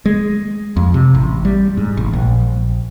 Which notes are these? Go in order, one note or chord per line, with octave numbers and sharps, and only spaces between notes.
G#3
F2
C3
A1
G3
G#2
A1
A#1